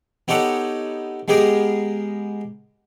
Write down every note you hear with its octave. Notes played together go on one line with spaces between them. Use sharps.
B3 D#4 G4 A4 C#5 F#5
G#3 B3 G4 G#4 A#4